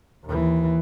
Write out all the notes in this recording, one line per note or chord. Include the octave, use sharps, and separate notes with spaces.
D#2 E3